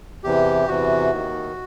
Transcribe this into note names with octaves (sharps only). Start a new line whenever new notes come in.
E2 C3 E3 G4
E2 C3 E3 F#4
D#2 D#3